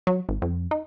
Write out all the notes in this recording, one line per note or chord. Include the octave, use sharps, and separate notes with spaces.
F#3
G#1
F2
D#4